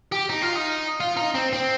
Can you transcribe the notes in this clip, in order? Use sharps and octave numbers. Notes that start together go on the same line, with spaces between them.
G4
D#4
F4
D#4
F4
D#4
C4
C4